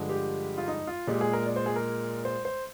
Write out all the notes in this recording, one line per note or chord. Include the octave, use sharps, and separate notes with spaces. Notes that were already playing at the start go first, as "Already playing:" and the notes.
Already playing: G2 D3 F3 G#3
G4
F4
D#4
F4
A#2 G#3 G4
G#4
A#4
D5
C5
G#4
A#4
C5
C5